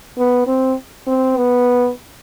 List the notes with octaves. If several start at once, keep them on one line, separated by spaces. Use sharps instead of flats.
B3
C4
C4
B3